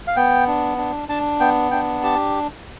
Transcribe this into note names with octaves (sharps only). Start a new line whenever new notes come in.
F5
B3 G5
D4
D4
D4 A5
B3 G5
D4 G5
G4 A5